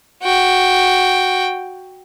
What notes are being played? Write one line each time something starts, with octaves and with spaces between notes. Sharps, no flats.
F#4 G5